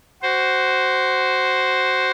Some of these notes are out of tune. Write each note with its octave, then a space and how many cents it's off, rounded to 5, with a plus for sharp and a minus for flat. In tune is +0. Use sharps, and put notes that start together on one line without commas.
F#4 +15 C5 +0